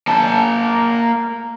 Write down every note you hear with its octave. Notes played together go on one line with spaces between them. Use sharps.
A#3 A5